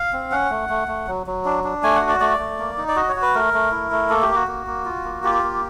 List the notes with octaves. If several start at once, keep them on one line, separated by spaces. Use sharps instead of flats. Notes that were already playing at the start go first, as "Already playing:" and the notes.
Already playing: F5
C4
C#4 F#5
A3
A3
A3
F#3
F#3
D4
D4
A3 G#5
F#5
F#4
D5
A3 D5
A3
A#3
D#4
D5
F#4 D#5
C#5
F#4
B4
A3 A#4
A3
E4
A3
A#3 A4
G4
A#3
F#4
A#3
A#3
F4
A#3
F4 G4
A#3